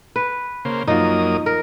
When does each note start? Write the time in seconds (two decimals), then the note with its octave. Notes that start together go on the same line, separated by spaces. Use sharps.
0.16 B4
0.65 C#3 A#3 C5
0.88 F#2 F3 A#3 D#4 D#6
1.46 A#4